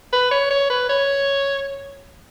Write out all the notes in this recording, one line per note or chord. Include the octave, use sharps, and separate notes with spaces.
B4
C#5
C#5
B4
C#5